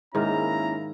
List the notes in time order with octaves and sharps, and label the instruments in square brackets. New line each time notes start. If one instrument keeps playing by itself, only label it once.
[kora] G#2 D#3 [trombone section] A#3 C#4 E4 [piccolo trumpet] A#5